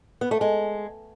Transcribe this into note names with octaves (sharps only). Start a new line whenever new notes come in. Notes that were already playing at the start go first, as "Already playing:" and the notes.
B3
A3
G#3